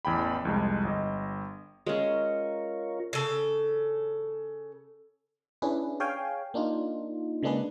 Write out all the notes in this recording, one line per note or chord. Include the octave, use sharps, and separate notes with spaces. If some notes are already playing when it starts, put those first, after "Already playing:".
A1 E2 G5 B5
C2 F2 G#3
G1 D#5
G#3 C#4 F4 A#4 C#5
C#3 A4
C#4 D4 E4 G#4 B4
G#4 C#5 F5 G5 G#5
A#3 D4 D#4 F4
C#3 G#3 A#3 D4 G#4 B4